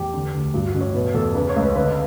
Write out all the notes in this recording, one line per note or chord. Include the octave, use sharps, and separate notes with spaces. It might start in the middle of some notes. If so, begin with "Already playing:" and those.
Already playing: E2 G4
D3
D2
G2 F#4
F#4
A1
C#5
B2 B4
E2 A4
C#3 B4
C#5
C#2
B4
D3 B4